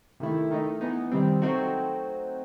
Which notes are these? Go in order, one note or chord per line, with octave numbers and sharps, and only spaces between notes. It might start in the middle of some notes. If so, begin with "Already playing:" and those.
C3 D#3 A3 E4
D#3 A3 D#4
E3 B3 D#4
C3 D#3 G3 C4
F#3 A3 C4 D#4 F#4